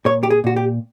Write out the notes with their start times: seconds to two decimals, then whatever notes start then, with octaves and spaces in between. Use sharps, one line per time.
0.05 A#2 C#5
0.23 G4
0.30 G#4
0.44 A#2 F#4
0.56 G4